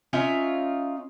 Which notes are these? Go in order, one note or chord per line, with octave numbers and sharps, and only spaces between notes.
C#4 D#4 F4 E5